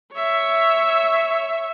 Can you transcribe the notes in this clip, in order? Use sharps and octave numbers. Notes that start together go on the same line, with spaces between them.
C#5 E5